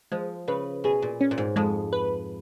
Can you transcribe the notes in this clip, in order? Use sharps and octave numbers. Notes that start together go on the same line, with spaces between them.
F3 G#3
C#3 B4
B2 G#4
A#2
C#4
A#2
G#2
F2 G#3
B4